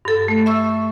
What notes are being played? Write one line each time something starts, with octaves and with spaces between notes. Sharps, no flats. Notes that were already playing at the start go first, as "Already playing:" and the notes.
G2 A4
A3
E5 C#6 E6